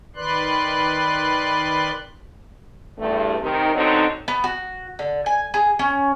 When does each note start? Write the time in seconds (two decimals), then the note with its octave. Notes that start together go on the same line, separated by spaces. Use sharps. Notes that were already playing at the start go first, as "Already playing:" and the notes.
0.16 D#3 B4 D5 C6 F#6
2.98 E2 G2 A3
3.41 C3 D#3
3.74 B2 D3 F#3 C4 D#4
4.28 B3
4.44 F#4
4.99 D3
5.26 G#5
5.54 G#4
5.79 C#4